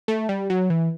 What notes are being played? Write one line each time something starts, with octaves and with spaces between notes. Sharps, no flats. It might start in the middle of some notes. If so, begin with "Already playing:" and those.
A3
G3
F#3
E3